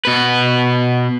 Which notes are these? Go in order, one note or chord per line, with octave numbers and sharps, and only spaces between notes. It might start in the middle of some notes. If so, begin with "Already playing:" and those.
B2 B4